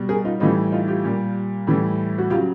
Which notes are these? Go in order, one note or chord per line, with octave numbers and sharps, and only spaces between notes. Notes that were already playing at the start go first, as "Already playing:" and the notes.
Already playing: B2 G3
G#4 A#4
D#4 F4
A2 E3 G3 D#4 F4
D#4 F4
F4 G4
A#2 G3
A2 E3 G3
F#4
C#3 F#3 F4 G4